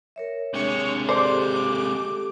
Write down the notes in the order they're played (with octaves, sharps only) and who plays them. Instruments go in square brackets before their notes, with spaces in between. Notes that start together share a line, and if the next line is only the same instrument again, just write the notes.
[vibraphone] A#4 C#5 E5
[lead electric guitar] C3 G#3 [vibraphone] D4 [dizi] C#5
[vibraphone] G4 A4 [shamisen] C5 D5 [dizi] D6